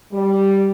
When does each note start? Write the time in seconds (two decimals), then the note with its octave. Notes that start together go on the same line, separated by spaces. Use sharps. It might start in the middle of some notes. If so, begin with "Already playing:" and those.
0.12 G3